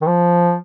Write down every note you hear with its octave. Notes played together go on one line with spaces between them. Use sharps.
D#3
F3